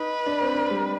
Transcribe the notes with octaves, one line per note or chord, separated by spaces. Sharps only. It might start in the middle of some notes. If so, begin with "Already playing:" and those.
Already playing: D#4 B4
D4
C4
D4
G3